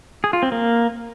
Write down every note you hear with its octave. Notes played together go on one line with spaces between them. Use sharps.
G#4
F4
C4
A#3